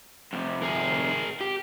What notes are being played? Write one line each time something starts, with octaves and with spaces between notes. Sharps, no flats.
F2 C3
G#4 A#4
G4